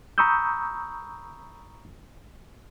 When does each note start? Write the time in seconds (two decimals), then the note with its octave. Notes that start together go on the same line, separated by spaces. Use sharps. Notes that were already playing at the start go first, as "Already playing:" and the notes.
0.18 A#5 B5 C#6 D#6 E6 G6